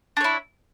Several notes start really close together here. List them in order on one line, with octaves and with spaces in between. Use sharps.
D4 C#5 E4